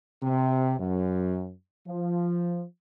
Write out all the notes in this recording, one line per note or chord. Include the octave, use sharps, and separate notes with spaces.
C3
F#2
F3